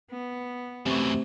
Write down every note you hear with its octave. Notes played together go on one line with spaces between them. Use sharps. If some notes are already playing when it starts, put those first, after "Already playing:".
B3
F#2 C3 E3 A3